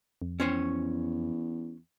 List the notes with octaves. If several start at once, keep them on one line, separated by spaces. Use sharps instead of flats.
F2
E2 C#4 C5 C#5